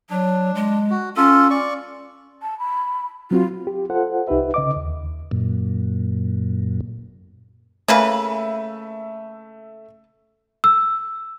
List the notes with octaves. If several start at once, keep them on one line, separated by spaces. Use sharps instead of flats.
F#3 D4
G#3
F#4
C#4 F4 A4
D5 C#6
A5
B5
F#3 C4 F4 F#4
G4
F4 A4 C5 F#5
C2 D#4 G4 B4 E5
C#3 D#5 D6
D#2
F#2 A#2
C#3 A3 A#3 B4 E5
E6